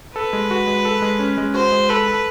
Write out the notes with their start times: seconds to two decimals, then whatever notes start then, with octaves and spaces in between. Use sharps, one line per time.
0.15 A4 B4
0.33 G#3
0.51 F#4
0.67 G#3
0.85 A4
1.02 G#3
1.19 C#4
1.38 G#3
1.54 F#4 C5
1.72 G#3
1.89 A4 B4
2.08 A4